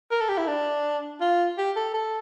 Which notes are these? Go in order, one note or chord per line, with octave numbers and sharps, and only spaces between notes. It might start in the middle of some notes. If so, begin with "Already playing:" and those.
A#4
A4
G4
E4
D4
F4
G4
A4
A4